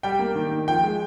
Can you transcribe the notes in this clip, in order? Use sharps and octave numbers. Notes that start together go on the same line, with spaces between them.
G3 G5
A#3
D#3
D#3
F3 G5
G#3